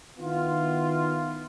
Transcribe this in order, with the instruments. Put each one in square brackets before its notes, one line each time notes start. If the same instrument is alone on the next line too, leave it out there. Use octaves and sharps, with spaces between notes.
[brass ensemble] D#3 B3 E4 F4